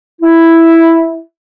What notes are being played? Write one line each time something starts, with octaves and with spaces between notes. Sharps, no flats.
E4